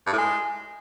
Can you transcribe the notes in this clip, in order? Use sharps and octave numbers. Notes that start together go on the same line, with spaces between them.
G2
A2
G#3